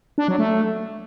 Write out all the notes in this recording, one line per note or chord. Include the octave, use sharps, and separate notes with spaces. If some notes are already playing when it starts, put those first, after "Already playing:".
D4
F#3
A3